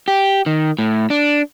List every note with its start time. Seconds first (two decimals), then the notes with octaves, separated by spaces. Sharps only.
0.08 G4
0.46 D#3
0.79 A2
1.10 D4